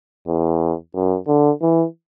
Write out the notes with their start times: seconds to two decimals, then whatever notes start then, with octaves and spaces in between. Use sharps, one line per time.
0.27 E2
0.94 F#2
1.27 D3
1.62 E3